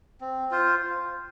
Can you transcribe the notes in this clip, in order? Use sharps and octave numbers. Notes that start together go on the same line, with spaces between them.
C4
F4 C5